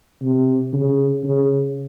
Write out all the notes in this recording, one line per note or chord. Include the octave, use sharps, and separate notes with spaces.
C3
C#3
C#3